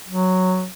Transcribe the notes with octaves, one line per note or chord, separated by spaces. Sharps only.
F#3